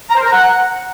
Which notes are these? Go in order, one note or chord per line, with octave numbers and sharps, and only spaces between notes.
A#5
C5
A#4
A#5
F#5